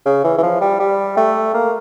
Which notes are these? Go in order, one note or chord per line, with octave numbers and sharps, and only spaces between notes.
C#3
E3
E3
F3
G3
G3
A3
A#3